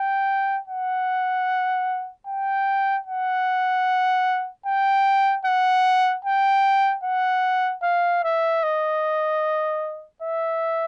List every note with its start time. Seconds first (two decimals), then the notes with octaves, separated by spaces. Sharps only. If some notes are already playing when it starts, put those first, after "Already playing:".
Already playing: G5
0.68 F#5
2.27 G5
3.07 F#5
4.66 G5
5.46 F#5
6.25 G5
7.04 F#5
7.83 F5
8.24 E5
8.63 D#5
10.22 E5